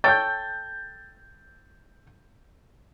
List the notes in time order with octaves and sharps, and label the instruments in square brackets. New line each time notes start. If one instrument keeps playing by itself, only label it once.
[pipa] A4 C#5 G5 [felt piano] G6 A6